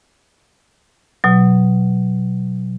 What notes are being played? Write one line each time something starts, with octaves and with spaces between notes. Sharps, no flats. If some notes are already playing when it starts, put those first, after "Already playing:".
B2 F#3